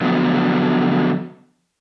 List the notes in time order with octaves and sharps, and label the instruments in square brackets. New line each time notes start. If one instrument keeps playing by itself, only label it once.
[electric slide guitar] D3 F3 F#3 B3